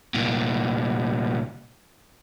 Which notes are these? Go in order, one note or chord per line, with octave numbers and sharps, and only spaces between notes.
C2 A#2